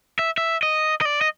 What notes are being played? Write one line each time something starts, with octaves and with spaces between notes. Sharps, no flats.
E5
E5
D#5
D#5
D5
D#5